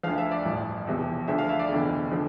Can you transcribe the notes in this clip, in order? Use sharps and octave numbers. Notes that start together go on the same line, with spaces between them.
D2 D3 F3 F5
E5
D5
A1 G2 F3
E1 E2 C3 F3
D2 D3 F3 E5
F5
E5
D5
F1 E2 D3
D3 F3